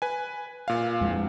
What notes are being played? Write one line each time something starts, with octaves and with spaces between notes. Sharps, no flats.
B4 G#5
A#2 F5
F2 G#3